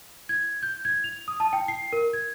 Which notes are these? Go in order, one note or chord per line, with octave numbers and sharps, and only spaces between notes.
G#6
G6
G#6
F7
D#6
A5
G5
C7
A#4
G#6